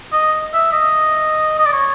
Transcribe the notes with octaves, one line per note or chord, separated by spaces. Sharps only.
D#5
E5
D#5
D#5
D5
C#5